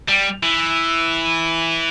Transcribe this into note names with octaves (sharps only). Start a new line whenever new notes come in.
G3
E3